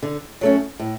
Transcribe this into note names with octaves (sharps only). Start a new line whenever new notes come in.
D3
F#3 A3 C#4
A2